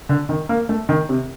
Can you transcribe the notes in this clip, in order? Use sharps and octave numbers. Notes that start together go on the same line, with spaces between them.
D3
D#3
A#3
A3
D#3
C3